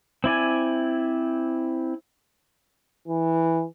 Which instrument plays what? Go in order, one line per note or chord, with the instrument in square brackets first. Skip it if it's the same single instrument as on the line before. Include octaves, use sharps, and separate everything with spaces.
[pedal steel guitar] C4 E4 D5 G#5
[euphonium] E3